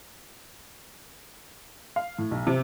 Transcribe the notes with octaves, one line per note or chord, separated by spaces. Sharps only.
F5
A2
B1
C3